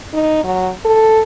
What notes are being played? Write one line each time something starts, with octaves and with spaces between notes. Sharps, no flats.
D#4
F#3
A4